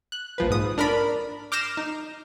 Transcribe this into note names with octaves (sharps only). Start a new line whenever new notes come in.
F#6
A#1 F3 B4
G#2 D#6
D4 A#4 D5 B5
D6 F6 G6 A#6 C7 E7
D#4